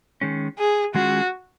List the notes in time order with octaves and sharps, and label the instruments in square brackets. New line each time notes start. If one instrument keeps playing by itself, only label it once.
[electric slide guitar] D#3 G#3 C#4
[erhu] G#4
[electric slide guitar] D#3 G#3 C#4 F4 G#4 [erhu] F#4